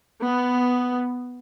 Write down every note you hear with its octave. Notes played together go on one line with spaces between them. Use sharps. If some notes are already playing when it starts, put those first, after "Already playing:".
B3